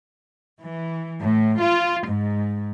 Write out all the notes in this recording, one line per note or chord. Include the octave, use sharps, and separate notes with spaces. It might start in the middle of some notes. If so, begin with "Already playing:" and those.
E3
A2
F4
G#2